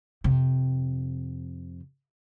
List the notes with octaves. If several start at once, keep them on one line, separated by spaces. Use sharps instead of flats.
F2 C3